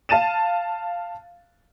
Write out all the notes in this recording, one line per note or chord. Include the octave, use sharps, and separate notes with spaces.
F5 A5 A6 D#7 E7